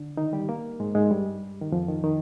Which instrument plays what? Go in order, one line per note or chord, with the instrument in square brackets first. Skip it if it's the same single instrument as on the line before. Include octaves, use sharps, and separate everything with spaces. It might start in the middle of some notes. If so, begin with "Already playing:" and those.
Already playing: [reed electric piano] D3 D4
D#3 D#4
G3 G4
A#3 A#4
G#2 G#3
G#2 G#3
G2 G3
D#3
F2 F3
D#3
D#3